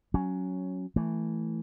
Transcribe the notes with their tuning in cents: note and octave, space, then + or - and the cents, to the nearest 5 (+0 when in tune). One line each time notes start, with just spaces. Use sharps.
F#3 +0 C#4 +0
E3 +0 A3 +0